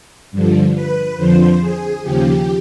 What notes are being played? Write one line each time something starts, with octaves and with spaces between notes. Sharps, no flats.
G2 D3 F3
B4
F2 D3 F3 C5
G#4
D#2 C#3 F3 G4